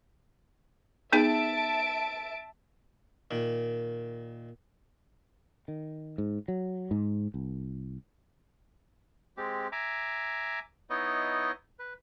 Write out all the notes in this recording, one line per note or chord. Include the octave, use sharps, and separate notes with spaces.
B3 D#4 G#4 E5 A5 D7
A#2 D#3
D#3
G#2
F#3
G#2
C2
G#3 C4 G4
E5 G#5 A#5 D6
B3 D#4 E4 C#5 D#5
B4